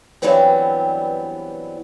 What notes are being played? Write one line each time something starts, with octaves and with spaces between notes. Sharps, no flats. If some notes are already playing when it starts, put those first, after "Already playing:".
G2 E3 F#3 G3 B3 C4